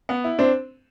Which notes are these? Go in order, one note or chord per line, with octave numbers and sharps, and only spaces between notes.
B3
E4
C4 D4